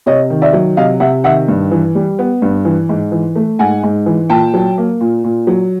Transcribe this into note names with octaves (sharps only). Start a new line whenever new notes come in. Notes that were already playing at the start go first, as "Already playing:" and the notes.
C3 C#5 D#5
D#3
D5 E5
F#3
C3 D#5 F5
C3 E5 F#5
D#3 E5 F#5
G2
E3
G3
B3
G2
E3
G#2
E3
A3
G#2 F#5 G#5
G#2
E3
A#2 G5 A5
F#3
A#3
A#2
A#2
F#3